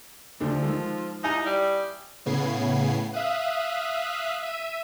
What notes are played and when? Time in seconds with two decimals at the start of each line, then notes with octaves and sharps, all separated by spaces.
0.40 D2 F3 A3 D4
0.63 D#3 G#3 A4
1.24 D#4 E4 G#5 D#6
1.45 G3
2.26 A2 C#3 B3 G#6 C7
3.13 E5 F5 D#6 F#6
4.43 E5 D#7